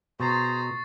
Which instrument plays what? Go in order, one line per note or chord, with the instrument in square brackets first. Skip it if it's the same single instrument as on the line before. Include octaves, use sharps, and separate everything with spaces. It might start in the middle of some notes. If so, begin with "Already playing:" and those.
[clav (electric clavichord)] B2 [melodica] G#4 C5 [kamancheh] A#5 [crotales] C#6 A6 C7